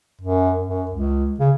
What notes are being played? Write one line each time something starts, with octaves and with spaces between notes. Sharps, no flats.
F#2
F#2
C#2
C#3